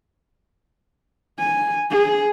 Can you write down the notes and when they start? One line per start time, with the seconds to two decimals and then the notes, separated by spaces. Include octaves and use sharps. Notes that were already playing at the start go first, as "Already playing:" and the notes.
1.39 G#5
1.91 G#4